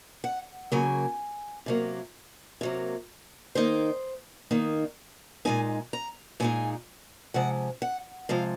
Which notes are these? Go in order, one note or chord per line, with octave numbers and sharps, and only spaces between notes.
F#5
C#3 F#3 A#3 G#5
C3 F#3 A#3
C3 F#3 A#3
D#3 A#3 D#4 C5
D#3 A#3 D#4
A#2 G#3 D#4 G#5
A#5
A#2 G#3 D#4 G#5
C3 F3 G#3 F#5
F#5
C3 F3 G#3 F5